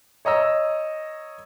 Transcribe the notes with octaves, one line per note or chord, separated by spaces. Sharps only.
C#5 D#5 A#5 E6